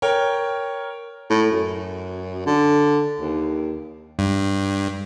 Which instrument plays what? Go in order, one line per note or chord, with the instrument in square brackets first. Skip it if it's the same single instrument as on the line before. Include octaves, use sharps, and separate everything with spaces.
[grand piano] A#4 C#5 G5
[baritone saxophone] A2
F#2
D3
D#2
[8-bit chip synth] G2